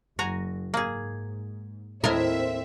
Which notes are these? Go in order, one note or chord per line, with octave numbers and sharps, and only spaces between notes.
F#1 F#4 G#5 A#5
G#2 A#3 G#4
D#2 A2 C4 E4 A#4 D#5 E5